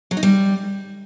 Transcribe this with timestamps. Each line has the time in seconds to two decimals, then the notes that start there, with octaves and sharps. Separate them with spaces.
0.11 F#3
0.17 D#4
0.23 G3